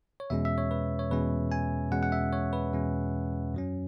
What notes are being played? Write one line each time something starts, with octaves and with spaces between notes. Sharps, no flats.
C#5
E2 B2 G#3 C#4 E5
E5
C#5
B4
C#5
E2 B2 G#3 C#4 B4
G#5
E2 B2 G#3 C#4 F#5
F#5
E5
C#5
B4
E2 B2 G#3 C#4
F#2 F#3 C#4